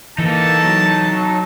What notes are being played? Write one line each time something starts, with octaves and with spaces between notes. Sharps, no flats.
E3 A#3 D#4 A4 A5
F#3